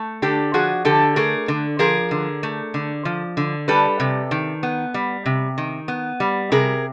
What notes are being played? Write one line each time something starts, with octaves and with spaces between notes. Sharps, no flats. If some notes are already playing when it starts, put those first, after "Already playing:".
Already playing: A3
D3 G4 A4
F3 F#4 G#4
D3 G4 A4
A3 G#4 A#4
D3
F3 G#4 A#4
D3
A3
D3
F3
D3
G3 A4 B4
C3
D#3
B3
G3
C3
D#3
B3
G3
C3 G#4 A#4